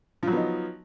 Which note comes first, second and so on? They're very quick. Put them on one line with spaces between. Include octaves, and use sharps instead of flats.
F3 F#3 B3 D#4